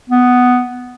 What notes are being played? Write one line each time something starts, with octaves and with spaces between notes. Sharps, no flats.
B3